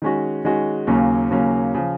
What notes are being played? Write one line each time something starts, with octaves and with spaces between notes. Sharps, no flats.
D#3 G#3 C#4 F#4
D#3 G#3 C#4 F#4
D#2 C#3 F#3 A#3 C#4
D#2 C#3 F#3 A#3 C#4
C#3 F3